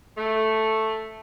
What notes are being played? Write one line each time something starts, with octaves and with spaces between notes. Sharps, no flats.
A3